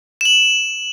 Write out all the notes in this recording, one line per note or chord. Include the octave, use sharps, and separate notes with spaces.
E7 F#7